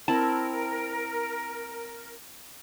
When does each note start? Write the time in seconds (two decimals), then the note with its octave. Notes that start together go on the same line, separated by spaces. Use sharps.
0.08 C4 E4 A#4 A5